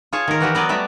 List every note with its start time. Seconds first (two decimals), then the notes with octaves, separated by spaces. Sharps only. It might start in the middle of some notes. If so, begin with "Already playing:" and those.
0.13 F4 G#4 C#5 A5
0.28 D#3 A#4
0.40 E3 F#4 G4
0.55 F#3 B3 B4 D5 D#5
0.69 G3 A3 E5